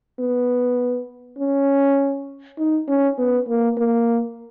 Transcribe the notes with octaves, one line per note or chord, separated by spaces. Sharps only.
B3
C#4
D#4
C#4
B3
A#3
A#3